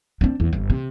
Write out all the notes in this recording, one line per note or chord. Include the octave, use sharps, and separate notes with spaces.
C4 D4
E2
G1
C3